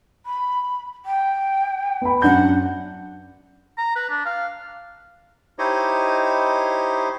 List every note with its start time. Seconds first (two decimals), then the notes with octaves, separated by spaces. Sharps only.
0.26 B5
1.05 G5
2.02 B3 B5
2.22 F#2 D4 F#5 G6
3.78 A#5
3.96 B4
4.10 D4
4.26 F5
5.59 D#4 E4 G4 C5 C#5 D#5